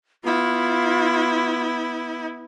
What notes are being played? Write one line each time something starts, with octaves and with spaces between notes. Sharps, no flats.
B3 E4 F4